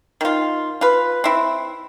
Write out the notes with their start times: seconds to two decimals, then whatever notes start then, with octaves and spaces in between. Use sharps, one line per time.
0.21 D#3 F4
0.81 F4 B4
1.24 C4 E4